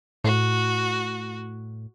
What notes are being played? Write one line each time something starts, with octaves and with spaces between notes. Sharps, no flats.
A2 F#4